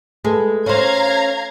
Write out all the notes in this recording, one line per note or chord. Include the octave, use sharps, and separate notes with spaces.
G#3 A3 A4 B4
C#4 C5 F5 A#5 G#6